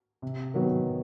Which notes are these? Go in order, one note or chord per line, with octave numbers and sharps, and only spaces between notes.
C3
D#3 F#3 B3